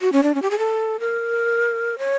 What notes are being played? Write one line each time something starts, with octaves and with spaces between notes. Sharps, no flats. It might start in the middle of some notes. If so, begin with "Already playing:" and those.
F#4
C#4
D4
C#4
G4
G#4
A4
A#4
C#5